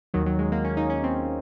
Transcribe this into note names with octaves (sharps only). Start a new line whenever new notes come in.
D#2 D#3 F#3
F#3
G#3
A#3
C#4
D#4
C#4
C4